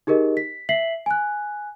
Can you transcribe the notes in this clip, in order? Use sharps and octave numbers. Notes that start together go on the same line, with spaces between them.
D#4 G4 G#4 A#4 D#5
B6
E5 B6 C7 F#7
G#5 F#6